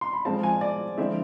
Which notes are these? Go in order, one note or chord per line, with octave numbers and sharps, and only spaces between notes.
C6
B5
F3 G#3 C4 F4 A5
G#5
D5
D3 F3 G#3 C4 E4 E5